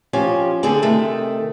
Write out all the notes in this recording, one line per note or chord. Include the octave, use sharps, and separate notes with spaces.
F3 C#4 G4
D3 C4 D4 G#4
C3 D#3 A3